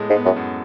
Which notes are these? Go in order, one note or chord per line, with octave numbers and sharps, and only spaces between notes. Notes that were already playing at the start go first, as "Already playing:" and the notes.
Already playing: A2 G#3 B3
G#2
B3
F#2
F#2